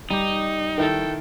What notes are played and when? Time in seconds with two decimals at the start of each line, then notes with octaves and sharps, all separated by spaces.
0.11 G3 D#4 G4
0.78 D#3 E4 A4 G5